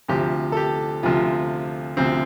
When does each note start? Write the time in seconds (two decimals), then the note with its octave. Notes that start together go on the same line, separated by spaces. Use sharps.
0.08 D2 C3 F3 G4
0.52 A4
0.57 G4
1.03 D2 C3 F3 F4
1.97 D2 C3 F3 C4